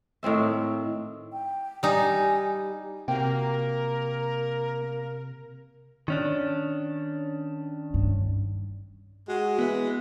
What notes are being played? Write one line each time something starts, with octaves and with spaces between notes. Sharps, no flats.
A2 D#3 C4 E5
G5
G3 D#4 G#5
C3 A#3 F#4 A#4 G5
D#3 C#4 D4
G2
G#3 F#4
E3 B3 B4